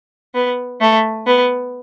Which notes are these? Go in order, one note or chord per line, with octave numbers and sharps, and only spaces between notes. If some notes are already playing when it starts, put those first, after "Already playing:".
B3
A3
B3